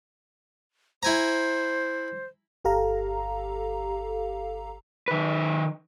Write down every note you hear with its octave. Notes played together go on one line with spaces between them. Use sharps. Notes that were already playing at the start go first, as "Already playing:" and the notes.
E4 C5 G#5 A#5
G1 G4 A4 F5 A#5
D#3 B4